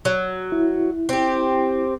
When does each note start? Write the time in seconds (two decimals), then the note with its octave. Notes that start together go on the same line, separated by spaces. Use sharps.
0.05 F#3
0.52 E4
1.09 C4 G4